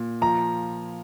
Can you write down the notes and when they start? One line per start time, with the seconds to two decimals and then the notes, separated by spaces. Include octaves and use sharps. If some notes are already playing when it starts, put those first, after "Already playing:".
Already playing: A#2
0.21 F3 A#5